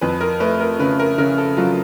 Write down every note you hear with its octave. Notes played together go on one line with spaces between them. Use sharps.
F2 B4
A#4
A3 B4
A#4
C#3 B4
A#4
C#3 A#4
A4
F#3 F4